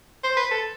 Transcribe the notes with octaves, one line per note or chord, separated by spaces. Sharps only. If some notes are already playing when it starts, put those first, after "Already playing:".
C5
B4
A4